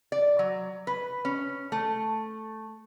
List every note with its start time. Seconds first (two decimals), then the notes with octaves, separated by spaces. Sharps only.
0.12 D5
0.39 F#3
0.87 B4
1.25 C#4
1.72 A3